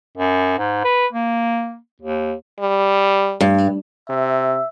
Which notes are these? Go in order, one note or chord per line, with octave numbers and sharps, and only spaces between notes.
F#2
G#2
B4
A#3
D#2
G3
G2
C3 E5